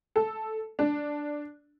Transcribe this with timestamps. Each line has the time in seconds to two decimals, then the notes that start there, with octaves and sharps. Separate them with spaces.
0.16 A4
0.79 D4